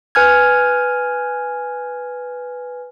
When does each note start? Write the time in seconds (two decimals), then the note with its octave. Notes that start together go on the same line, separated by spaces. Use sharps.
0.15 B4 G#5 F6 G#6